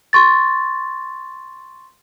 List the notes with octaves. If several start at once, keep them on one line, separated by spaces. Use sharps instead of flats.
C6 C#6 A6